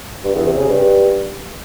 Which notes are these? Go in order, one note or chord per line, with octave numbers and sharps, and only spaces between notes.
G2
E2
C3
C#3
G2